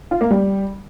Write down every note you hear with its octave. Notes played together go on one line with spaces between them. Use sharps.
F4
A#3
G3